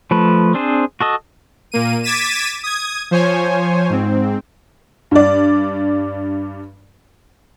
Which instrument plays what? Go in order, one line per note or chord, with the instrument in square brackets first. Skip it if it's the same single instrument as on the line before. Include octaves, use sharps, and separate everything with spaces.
[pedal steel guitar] F3 A3 B4
C4 D4 G#4 C5
F#4 A4 D#5
[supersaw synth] A#2 A#3 D#7
D6 G#6 A6 B6 D#7 E7
D#6 G#6
F3 C5 C#5 G#5
G#2 C4
[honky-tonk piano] G2 D5